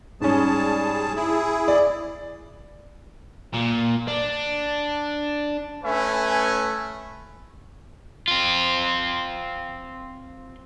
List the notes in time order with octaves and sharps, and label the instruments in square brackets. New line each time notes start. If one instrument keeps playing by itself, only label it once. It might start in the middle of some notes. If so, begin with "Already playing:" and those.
[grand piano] G#2 C#4 [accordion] G3 G#4 A5
[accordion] E4 G#4
[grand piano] D5
[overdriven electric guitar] A#2
D4
[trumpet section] A3 C#4 B4 E5 G#5
[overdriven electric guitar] C4 F4